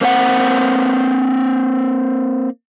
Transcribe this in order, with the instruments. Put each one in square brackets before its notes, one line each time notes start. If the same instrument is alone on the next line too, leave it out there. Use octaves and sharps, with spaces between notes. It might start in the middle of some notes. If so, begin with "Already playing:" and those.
[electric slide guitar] A#3 C4 F4 F#5